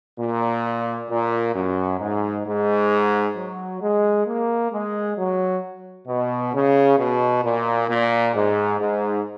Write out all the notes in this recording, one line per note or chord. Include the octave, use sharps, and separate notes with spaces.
A#2
A#2
F#2
G#2
G#2
F#3
G#3
A#3
G#3
F#3
B2
C#3
B2
A#2
A#2
G#2
G#2